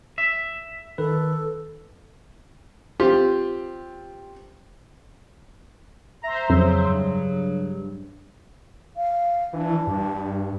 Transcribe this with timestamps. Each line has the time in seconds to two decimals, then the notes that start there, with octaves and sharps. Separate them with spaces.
0.18 E5
0.98 D#3 A4 B4
3.00 C4 F4 G4
6.23 C5 E5 A#5
6.50 F2 C#3 F#3
6.87 G2
8.96 F5
9.53 E3 D4
9.87 G2